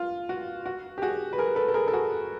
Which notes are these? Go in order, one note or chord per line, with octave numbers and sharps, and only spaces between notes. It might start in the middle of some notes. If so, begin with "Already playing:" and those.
Already playing: F4
F#4
F#4
G4
F#4 G#4
B4
G#4 A#4
A4 B4
A4
G#4 A#4
A4
F#4 G#4